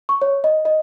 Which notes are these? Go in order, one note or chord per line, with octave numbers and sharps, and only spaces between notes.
C#6
C#5
D#5
D#5